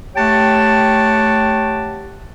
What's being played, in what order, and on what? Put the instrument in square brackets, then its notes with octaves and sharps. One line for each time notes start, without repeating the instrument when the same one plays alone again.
[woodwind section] A3 G4 C#5 F#5 G5 A5